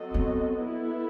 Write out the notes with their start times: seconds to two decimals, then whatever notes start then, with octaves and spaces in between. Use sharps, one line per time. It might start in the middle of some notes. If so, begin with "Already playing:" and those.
Already playing: F#3 C4 F#4 A4 D#5
0.14 B3
0.59 B3 E4 A4